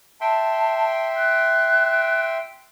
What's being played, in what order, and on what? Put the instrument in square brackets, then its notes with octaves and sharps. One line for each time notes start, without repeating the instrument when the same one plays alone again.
[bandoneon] E5 G5 C6 [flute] A5
[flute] F#6